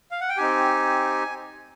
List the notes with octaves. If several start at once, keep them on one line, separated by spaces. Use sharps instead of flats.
F5
F#5
G5
C4 D#4 G4 G#5